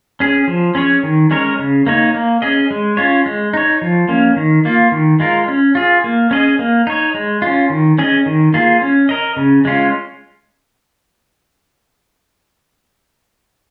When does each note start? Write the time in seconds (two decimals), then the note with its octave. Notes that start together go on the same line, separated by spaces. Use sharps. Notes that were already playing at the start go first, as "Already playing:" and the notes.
0.20 C#4 G#4
0.48 F3
0.75 C#4 G#4 C#5
1.03 D#3
1.31 G#3 C#4 A#4 C#5
1.59 C#3
1.86 A#3 D#4 C#5
2.14 A#3
2.42 C#4 G#4 D#5
2.71 G#3
2.97 C#4 F4 C#5
3.26 G#3
3.53 D#4 C#5
3.82 F3
4.09 A#3 C#4
4.36 D#3
4.65 A#3 F4
4.92 D#3
5.20 G#3 F4 A#4
5.48 C#4
5.75 F4 G#4
6.04 A#3
6.31 C#4 G#4 D#5
6.59 A#3
6.87 D#4 C#5
7.14 G#3
7.42 C#4 F4
7.70 D#3
7.98 C#4 G#4 D#5
8.26 D#3
8.54 A#3 F4 G#4
8.82 C#4
9.09 A#4 D#5
9.37 C#3
9.65 G#3 C#4 F4